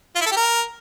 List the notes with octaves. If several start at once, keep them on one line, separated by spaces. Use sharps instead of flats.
F4
E4
A4
G4
A#4